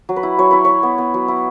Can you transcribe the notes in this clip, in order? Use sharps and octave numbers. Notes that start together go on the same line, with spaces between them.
F#3
B4
E4
F#3 C#5
E4 B4
E4 C#5
B3
B3
F#3
E4